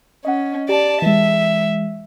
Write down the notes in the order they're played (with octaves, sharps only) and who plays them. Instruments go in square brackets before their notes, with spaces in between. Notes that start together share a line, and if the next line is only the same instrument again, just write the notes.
[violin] C#4 [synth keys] D#5 F#5
[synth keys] G4 [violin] D5 A5
[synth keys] E3 G#3 [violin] E5